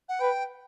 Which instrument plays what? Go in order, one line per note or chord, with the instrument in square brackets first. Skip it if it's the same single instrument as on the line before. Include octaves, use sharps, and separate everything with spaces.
[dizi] F#5
[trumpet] B4 [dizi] G5